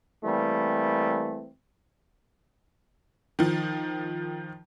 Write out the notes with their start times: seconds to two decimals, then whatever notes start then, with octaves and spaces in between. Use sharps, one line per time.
0.23 E3 G3 A3 A#3 C4
3.39 D#3 F3